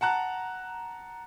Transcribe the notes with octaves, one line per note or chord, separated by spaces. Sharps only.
F#5 A5 A#5 F#6